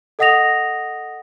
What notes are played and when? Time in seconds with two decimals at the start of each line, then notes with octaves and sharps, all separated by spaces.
0.19 A4 D#5 F#5 D#6 A#6 F7